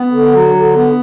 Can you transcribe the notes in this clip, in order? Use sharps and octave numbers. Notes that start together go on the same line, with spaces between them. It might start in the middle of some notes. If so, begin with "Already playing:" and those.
Already playing: B3
D3
F#3
D3
B3